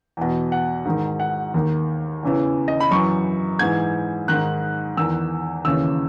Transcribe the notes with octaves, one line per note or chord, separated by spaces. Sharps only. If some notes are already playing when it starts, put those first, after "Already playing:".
E2 B2
F#5
G#2 D#3
F#5
D#2 D#3
E2 C#3 E3
D#5
B5
F#2 E3 C#6
G#2 E3 G#6
G#2 D#3 F#6
E2 D#3 E6
D#2 C#3 E3 E6